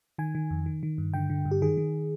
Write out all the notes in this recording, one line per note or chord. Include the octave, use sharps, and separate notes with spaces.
D#3 G#5
D#3
F2
D#3
D#3
G2
D3 G5
D3
G2
G4
D#3 G#4
D#3